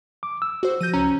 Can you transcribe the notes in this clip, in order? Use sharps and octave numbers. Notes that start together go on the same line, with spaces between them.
D6
E6
F#4 C5
F3 G6 A#6 D#7
C#2 C#4 A#5